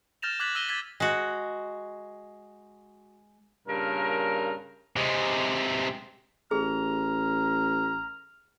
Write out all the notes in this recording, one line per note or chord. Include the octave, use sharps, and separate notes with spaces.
F6 G6 A6 A#6 E7 F7
D6 F#6 G#6 A6 B6 F#7
E6 A#6 D#7 G7
E6 G#6 A6 B6
G#3 F#4
G2 A#2 C#3 A#4
C3 G#3
A1 G#4 A#5 F6